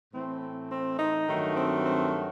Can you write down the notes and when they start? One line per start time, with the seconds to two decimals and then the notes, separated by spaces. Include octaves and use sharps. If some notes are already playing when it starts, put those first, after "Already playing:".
0.14 A2 E3 A3 C4
0.43 C4
0.71 C4
0.99 D#4
1.28 G2 D#3 F#3 A3
1.56 C4
1.85 C4